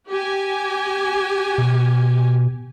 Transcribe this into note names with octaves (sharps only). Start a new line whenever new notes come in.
G4 G#5
B2